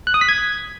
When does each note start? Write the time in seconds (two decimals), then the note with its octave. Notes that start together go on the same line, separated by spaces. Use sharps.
0.07 F#6
0.14 D#6
0.21 B6
0.29 G#6